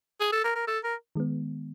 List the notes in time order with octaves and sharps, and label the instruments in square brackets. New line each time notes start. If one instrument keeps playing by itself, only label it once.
[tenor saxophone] G#4
A4
A#4
A#4
A4
A#4
[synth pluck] D#3 G#3 B3